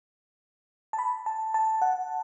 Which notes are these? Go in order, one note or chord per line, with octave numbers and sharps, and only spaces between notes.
A5
B5
A5
A5
F#5